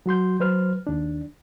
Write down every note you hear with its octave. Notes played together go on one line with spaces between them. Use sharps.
F#3 F#4 C6 G6
F#3 B4 C5 F6
D#2 D4